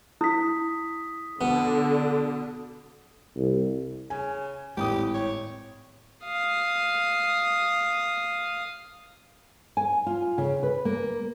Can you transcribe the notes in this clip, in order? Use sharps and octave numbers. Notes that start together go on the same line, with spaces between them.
E4 D#6 B6
B2 D3
C2
C#3 G#5
G#1 A2 G4 D#6
C#5
F5 D#6
G#5
F4
C#3
B4
A#3